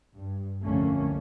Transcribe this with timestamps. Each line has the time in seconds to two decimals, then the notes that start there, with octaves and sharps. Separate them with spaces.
0.16 G2
0.63 C2 F2 D3 A3 A#3 C#4